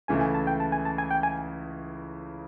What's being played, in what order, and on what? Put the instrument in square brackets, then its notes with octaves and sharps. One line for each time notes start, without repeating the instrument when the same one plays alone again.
[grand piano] C#2 C#3 E3 A3 [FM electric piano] G#5
[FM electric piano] G#5
A5
G5
A5
G#5
A5
G#5
G5
G#5